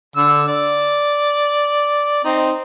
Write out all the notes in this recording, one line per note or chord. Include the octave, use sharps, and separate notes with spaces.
D3 E6
D5
C4 D#4